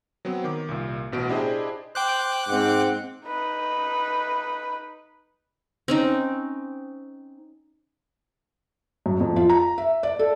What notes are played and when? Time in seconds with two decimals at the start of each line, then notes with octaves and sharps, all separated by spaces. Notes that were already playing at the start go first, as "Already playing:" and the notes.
0.25 F#3 B3 C4 F#4
0.44 D#3 D6
0.68 C2 A#2
1.12 A1 B2 F#4 D7
1.29 D4 E4 G4 G#4 C5 D#5
1.95 C5 G5 D6 F#6
2.49 G#2 C4 F#5
3.27 D#4 B4
5.88 C4 C#4 D#4
9.06 F#2
9.20 F2
9.36 F4
9.50 A#5
9.78 E5
10.03 D5
10.19 A4